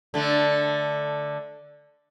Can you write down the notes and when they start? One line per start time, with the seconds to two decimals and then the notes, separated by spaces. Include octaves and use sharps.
0.14 D3 A3